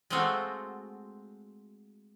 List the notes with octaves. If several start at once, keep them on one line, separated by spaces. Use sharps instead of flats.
G#3 A3 C4 F4 F#4